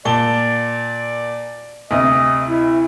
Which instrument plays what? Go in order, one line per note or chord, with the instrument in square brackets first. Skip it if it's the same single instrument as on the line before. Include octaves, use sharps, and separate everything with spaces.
[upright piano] A#2 A5 G7 [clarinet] D5
[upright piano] D2 C3 [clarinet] D#5
[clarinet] E4